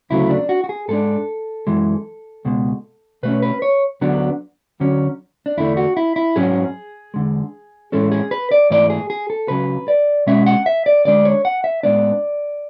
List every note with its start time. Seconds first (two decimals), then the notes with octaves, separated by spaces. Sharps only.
0.10 D2 C#3 F#3 A3 E4
0.30 D4
0.49 F#4
0.64 F#4
0.69 G#4
0.88 G#2 G#3 D4 A4
1.67 F#2 E3 G#3
2.45 C#2 B2 G#3
3.23 B2 A3 C#4 B4
3.42 B4
3.62 C#5
4.01 D2 D3 F#3 B3 D4
4.80 D2 D3 F#3 C#4
5.46 D4
5.57 E2 D3 A3 D4 E4
5.77 F#4
5.97 E4
6.16 E4
6.36 G#2 F#3 C#4 G#4
7.14 E2 D3 G#3
7.92 A2 E3 G#3 C#4 A4
8.12 G#4
8.31 B4
8.51 D5
8.70 G#2 E3 A3 D5
8.90 G#4
9.10 G#4
9.30 A4
9.48 C#2 C#3 F#3 B4
9.88 D5
10.27 B2 G#3 C#4 E5
10.46 F#5
10.66 E5
10.86 D5
11.05 D2 D3 G#3 D4 D5
11.25 C#5
11.45 F#5
11.64 E5
11.83 A2 G#3 B3 D4 D5